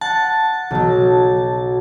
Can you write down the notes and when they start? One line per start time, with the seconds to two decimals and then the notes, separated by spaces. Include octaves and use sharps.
0.01 F#5 A5
0.71 B1 F#3